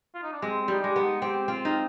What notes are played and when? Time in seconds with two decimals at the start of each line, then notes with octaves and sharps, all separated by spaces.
0.15 F4
0.23 D#4
0.33 D4
0.42 G#3 C4
0.62 C4
0.68 G3 D#4
0.82 G#3 D4
0.96 B3
1.02 D#4
1.21 C4 G4
1.48 C4 F4
1.65 D#4